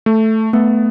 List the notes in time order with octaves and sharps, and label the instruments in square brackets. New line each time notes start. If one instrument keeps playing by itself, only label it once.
[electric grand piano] A3
[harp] A3 [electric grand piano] B3